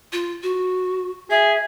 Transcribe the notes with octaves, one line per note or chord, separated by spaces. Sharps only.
F4
F#4
G#4 E5